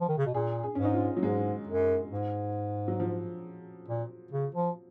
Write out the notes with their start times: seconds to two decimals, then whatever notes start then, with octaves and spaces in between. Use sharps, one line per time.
0.01 F3
0.08 D#3
0.18 C#3
0.26 B2
0.34 A#2 G#4
0.63 G#4
0.75 G#2 C#4
0.85 D#4
0.94 F4
1.17 F#3
1.22 G#2 G#3
1.68 F#2
2.11 G#2
2.88 F#3
3.00 F3
3.88 A#2
4.32 C#3
4.55 F3